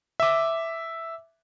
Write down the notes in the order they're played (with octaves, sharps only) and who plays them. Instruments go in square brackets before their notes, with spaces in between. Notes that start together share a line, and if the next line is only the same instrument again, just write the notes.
[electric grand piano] E5 D6